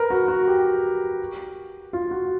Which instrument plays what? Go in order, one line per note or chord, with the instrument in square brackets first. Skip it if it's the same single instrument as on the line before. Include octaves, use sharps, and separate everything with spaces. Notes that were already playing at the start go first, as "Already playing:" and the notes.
Already playing: [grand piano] A#4 B4
F#4
F#4
G4
F4
F#4